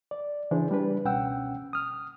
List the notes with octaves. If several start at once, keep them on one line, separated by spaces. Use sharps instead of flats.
D5
C#3 E3 D4 G#4 C5
G3 D4 B4
C#2 B2 C#4 F#5 G5 E6
D#6 F6